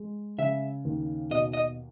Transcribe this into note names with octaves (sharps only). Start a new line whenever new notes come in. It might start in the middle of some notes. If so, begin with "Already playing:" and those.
Already playing: G#3
C#3 E5
D#2
B2 D#5
D#5